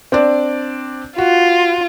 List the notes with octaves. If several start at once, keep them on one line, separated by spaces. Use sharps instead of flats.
C4 D4 D5
F4 F#4